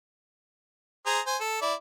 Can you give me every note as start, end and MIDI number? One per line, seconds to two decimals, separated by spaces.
1.06 1.20 68
1.06 1.20 72
1.06 1.20 82
1.27 1.37 72
1.27 1.37 80
1.40 1.61 69
1.62 1.74 64
1.62 1.74 74